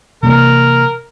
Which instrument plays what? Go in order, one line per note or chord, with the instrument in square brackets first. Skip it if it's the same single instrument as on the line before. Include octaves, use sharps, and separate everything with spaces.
[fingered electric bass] C3 E3 A#3 [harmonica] A#4